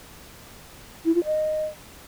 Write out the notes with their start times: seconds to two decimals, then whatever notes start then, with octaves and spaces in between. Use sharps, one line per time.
1.05 E4
1.15 F4
1.25 D#5